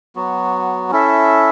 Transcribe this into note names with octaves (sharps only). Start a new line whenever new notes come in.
F#3 B3 F#4
C#4 E4 A4 E5